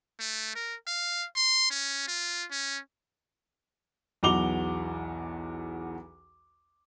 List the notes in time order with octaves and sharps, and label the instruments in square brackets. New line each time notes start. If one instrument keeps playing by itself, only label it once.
[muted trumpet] A3
A#4
F5
C6
C#4
F4
C#4
[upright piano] B1 E2 F#4 D6 F7 G7